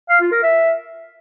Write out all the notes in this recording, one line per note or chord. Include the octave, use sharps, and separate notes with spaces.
F5
F4
A#4
E5